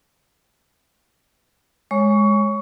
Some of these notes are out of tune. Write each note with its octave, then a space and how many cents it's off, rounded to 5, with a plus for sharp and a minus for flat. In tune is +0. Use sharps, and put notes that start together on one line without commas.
G#3 +0 C#5 +0 C#6 +20